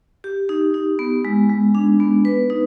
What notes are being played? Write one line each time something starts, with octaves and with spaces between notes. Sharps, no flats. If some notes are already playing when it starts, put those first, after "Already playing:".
G4
D#4
D#4
B3
G#3
G#3
D4
B3
B4
D#4